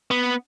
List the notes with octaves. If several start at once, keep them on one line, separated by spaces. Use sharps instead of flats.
B3